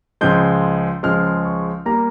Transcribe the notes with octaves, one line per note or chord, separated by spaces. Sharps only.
C#2 C#3 F3 G#3 G6
C#2 C#3 F3 G#3 F6
C#6
G3 A#3 A#5